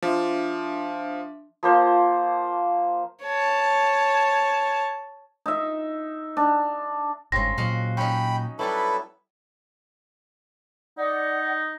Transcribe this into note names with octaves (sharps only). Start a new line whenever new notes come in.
F3 D4 E5
F3 A#3 C5
C#5 A5
D#4 E5
D4
G1 G#2 C#3 C4 A#6
A#2 F#3 F#4 D#5 F5
C#4 D#4 G5 B5
F#3 G3 B3 E4 A4 B4
D#4 D5 F#5